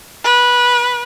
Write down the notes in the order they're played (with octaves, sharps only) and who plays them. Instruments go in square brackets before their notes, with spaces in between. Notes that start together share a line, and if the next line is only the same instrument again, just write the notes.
[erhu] B4